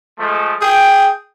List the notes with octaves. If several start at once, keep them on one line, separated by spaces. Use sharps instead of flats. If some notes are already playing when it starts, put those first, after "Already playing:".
F3 G#3 A3
G#4 G5